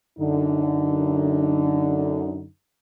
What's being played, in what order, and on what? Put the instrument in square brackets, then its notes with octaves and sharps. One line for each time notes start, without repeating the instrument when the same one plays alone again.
[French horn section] F#2 D3 D#4